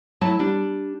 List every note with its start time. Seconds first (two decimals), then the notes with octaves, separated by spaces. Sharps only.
0.21 F#3 A3 E4 A5
0.39 G3 D4